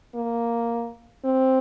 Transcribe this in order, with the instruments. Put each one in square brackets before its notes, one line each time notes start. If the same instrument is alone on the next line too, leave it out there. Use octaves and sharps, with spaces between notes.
[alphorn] A#3
C4